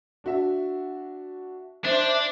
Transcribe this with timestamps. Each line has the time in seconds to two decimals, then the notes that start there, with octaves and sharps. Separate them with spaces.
0.24 D4 F#4 E5
1.85 D4 C5 E5